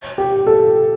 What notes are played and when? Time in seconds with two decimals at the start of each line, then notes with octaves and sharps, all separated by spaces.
0.18 G4
0.47 A4